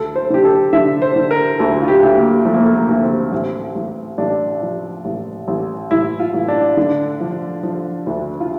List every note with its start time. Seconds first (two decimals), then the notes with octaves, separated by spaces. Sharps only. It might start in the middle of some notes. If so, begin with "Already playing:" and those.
Already playing: D2 A4
0.16 C5
0.30 D3 G4
0.44 A4
0.73 D3 E5
1.02 C5
1.16 D3
1.31 A#4
1.59 D2 A4
1.82 F4
1.88 G4
2.03 D2
2.17 A#3
2.45 F3 A3
2.54 A#3
2.62 A3
2.75 A#3
2.89 D2
3.03 C4
3.32 A1
3.75 A1
4.18 A1 D4
4.62 F3
5.05 A1
5.48 A1
5.91 A1 E4
6.20 F4
6.34 A1
6.48 D4
6.77 D3
7.20 F3
7.63 F3
8.07 D2
8.40 F4